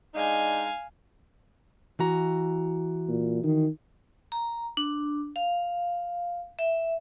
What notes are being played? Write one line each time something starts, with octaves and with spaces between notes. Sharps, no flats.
G#3 D4 D#4 F5 G#5
E3 F#4 A#5
A#2
D#3
A#5
D4
F5
E5